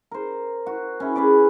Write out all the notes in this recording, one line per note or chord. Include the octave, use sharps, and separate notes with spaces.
A#4 C5
F#4
C#4 E4
C#4 G#4 B4 D5